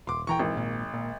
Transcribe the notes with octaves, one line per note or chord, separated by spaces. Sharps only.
D#1 C6 D6
D#1 E3 G5 A#5 C#6
G#1
A#1 A#2
A#2